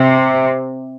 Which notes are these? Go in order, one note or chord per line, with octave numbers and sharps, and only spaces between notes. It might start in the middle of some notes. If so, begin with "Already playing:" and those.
Already playing: C3